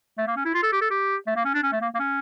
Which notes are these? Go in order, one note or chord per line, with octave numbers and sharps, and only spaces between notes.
A3
A#3
C#4
E4
F4
A4
G4
A4
G4
A3
A#3
C#4
D4
C#4
A3
A#3
A#3
C#4